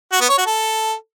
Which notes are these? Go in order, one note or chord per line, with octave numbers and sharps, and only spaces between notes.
F#4
B3
C#5
F#4
A4